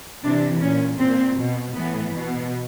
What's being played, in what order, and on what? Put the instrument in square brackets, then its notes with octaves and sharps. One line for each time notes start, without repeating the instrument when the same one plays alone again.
[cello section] C3 E3 D4
A#2 C#4
A#2 C4
B2
A2 E3 B3
B2